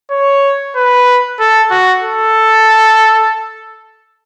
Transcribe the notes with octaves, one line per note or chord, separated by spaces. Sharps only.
C#5
B4
A4
F#4
A4